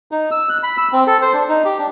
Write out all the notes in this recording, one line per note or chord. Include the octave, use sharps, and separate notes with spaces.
D#4
E6
F#6
B5
E6
C4
A4
C5
D4
D#4
G4
D4